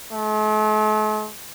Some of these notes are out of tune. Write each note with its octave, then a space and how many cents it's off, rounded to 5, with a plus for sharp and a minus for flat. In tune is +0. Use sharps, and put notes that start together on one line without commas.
A3 -45